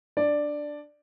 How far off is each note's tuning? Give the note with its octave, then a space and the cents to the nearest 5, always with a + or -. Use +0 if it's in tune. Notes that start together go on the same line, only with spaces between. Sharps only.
D4 +0 D5 +5